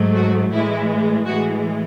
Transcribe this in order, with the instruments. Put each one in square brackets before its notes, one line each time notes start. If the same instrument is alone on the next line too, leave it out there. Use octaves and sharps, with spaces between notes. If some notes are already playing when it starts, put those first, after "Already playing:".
Already playing: [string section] G#2 F#3 A3
F#4
A2 E3 G#3 E4
A2 E3 G#3 F#4